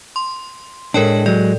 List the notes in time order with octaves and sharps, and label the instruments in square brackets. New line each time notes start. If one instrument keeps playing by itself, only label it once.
[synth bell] C6
[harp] A2 B6 [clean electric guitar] G#3 D4 [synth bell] A#4 C#5 G5
[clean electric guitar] F#3 G#3 [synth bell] D5